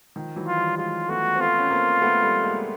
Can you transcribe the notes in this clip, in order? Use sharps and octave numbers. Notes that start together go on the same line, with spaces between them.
D#3 F3
E3 F#3
F4
F3 G3
F#3 G#3 F4
A3 B3 F#4
C4
A3 B3 F4
C#4
A#3 C4
A3 B3
G3 A3
G#3 A#3